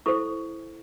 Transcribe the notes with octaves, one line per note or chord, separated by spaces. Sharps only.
E4 A4 C5 C#6